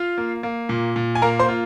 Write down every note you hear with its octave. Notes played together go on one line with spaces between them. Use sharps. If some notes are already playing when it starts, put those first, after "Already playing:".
Already playing: F4 F5
A#3
A#3
A#2
A#2
G#5
A#3 A#4 A#5
C5 C6
F4